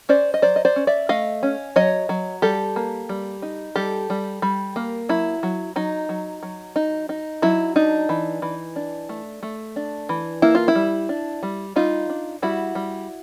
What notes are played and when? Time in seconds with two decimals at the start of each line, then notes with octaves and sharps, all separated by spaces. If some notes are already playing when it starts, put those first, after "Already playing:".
0.09 C#4 C5 D5
0.34 D#5
0.42 F#3 C5 D5
0.56 D#5
0.65 C5 D5
0.76 C#4
0.87 D5 E5
1.09 A3 D#5 F5
1.43 C#4
1.76 F#3 C#5 D#5
2.09 F#3
2.42 G3 G4 A4
2.76 A#3
3.09 G3
3.42 D#4
3.76 G3 G4 A4
4.10 G3
4.42 G3
4.76 A#3
5.09 F#3 E4
5.43 F#3
5.76 F#3 D#4
6.09 F#3
6.43 F#3
6.76 D#4
7.09 D#4
7.42 F#3 E4
7.76 D4 D#4
8.09 E3
8.42 E3
8.76 D4
9.09 A3
9.43 A3
9.76 D4
10.09 E3
10.42 A#3 E4
10.55 F4
10.68 E4
10.75 G3
11.09 D4
11.43 G3
11.76 G3 D#4 F4
12.10 D4
12.42 G3 E4 F#4
12.75 G3